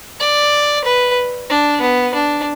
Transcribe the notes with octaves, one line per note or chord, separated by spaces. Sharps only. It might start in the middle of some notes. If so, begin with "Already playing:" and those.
D5
B4
D4
B3
D4